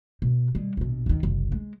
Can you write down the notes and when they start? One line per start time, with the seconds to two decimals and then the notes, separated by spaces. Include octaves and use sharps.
0.22 B2
0.55 G3 G#3
0.77 A#1 B2
1.06 D#2 D#3
1.23 F#1 C2
1.52 G#3